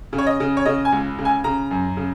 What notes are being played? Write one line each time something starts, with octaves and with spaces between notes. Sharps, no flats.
C#3
C#5
D#5
C#3
C#5
C#3 D#5
G#5
C#2
C#3
G#5
C#3 A#5
F#2
C#3